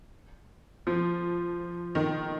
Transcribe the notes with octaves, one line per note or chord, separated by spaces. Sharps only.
F3
D#3